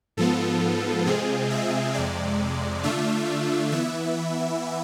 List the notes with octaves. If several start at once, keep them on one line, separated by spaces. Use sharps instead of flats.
G#2 F3 B3 F4 A4
C3 G#3 C4 F4 G#4
E5
F2 C3 G#3 D5
D3 A3 D4 F4 E5
E3 B3 E4 E5